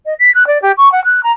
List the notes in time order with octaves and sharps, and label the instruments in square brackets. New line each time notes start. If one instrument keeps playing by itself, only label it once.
[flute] D#5
B6
F#6
D5
G4
C#6
F#5
F#6
A#5